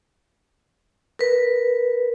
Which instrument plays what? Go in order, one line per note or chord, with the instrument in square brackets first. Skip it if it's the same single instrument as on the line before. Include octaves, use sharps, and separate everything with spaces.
[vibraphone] A#4 B4